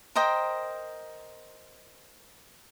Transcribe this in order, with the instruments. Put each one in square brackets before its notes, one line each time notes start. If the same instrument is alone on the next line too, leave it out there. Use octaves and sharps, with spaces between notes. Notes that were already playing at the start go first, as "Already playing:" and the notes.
[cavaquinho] A#4 C5 D#5 G5